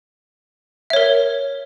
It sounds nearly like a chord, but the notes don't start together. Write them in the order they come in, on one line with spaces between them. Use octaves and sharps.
E5 C#5 A#4